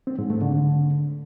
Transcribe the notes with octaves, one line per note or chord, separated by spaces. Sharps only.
C4
G#2
A3
D3